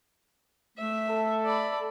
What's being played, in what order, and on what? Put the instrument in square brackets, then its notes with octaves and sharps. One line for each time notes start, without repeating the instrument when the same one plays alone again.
[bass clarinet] A3 [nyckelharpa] E5
[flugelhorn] A4
[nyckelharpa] D5 B5